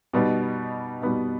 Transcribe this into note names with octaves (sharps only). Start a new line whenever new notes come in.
B2 G3 B3 D#4
B2 G3 B3 D#4